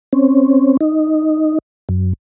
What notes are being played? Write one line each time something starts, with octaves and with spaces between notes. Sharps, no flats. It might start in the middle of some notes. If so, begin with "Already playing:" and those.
C4 C#4
D#4
F#2